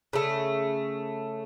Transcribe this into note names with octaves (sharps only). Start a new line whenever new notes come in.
C#3 A3